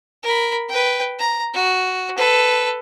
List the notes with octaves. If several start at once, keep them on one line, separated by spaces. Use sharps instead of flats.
A#4 B5
B4 G5
A#5
F#4
A4 B4